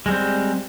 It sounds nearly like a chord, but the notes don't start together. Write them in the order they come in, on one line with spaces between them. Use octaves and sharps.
G#3 G3 C4